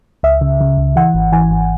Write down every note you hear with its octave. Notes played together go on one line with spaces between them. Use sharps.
C#2 E5
C#3
C#3
C#2
E3 F#5
G#1
E3 G#5
G#1